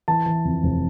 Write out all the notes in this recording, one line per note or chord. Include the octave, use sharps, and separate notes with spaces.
E3 A5
E3
F2
F1